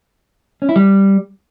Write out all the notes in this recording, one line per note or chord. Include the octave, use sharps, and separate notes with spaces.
C#4
E4
G3